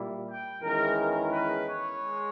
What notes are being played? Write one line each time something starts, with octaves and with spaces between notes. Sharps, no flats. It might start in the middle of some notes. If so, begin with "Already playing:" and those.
Already playing: A#2 G3 A#3 E4
G5
E2 D#3 G#3 C#4 E4 A#4
A#4
B4
C#5
G#3